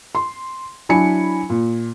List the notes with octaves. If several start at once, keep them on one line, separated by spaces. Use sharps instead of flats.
C6
F#3 D4 E4 G#5 B5 C#7
A#2